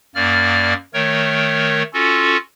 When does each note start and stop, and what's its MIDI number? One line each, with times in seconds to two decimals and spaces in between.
0.15 0.73 42
0.15 0.73 58
0.15 0.73 74
0.15 0.73 89
0.94 1.83 51
0.94 1.83 57
0.94 1.83 70
0.94 1.83 73
1.93 2.37 61
1.93 2.37 65
1.93 2.37 66
1.93 2.37 69